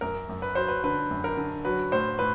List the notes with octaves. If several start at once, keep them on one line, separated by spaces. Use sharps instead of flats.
F#2 A#4
F#2
B4
F#3 C5
B4
D3 B4
F#2
A#4
D3
F#3 B4
A2 C5
A2 B4